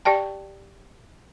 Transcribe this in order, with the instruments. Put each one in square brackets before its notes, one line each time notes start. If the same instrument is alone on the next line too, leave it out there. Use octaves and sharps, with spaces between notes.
[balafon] G4 D5 G5 A5